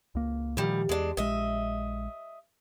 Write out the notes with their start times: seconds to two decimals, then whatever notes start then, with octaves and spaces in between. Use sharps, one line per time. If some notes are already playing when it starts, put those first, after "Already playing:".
0.15 C#2 A#3
0.57 D2 A#2 D#3 F3 G3
0.89 E2 G#3 D4
1.17 A#1 G#3 D#5 E5